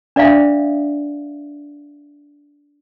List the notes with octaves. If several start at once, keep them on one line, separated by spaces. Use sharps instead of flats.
D4 D5 E5 F5